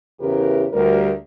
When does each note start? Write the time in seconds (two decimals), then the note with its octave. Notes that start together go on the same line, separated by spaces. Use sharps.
0.20 E2 C#3 E4 G4 A#4 B4
0.73 D2 G3 A#4